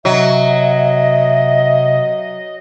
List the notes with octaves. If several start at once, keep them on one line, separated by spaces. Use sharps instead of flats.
C3 F#3 D#5 E5